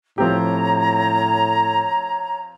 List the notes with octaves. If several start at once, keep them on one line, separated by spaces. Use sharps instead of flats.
A2 F3 C4 G4 C#5 A#5